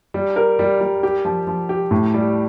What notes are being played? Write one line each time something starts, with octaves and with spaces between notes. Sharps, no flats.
G3
A#4
G3
G3
G4
F3
F3
G4
A2
G3